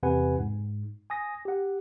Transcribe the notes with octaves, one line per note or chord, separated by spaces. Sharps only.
E2 C3 B4 F#5 G#5
G#2
G#5 D#6 A#6
G4 F#5